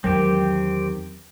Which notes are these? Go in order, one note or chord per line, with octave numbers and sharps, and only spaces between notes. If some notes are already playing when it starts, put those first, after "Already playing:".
E2 D#3 F#3 G#3 C4 G4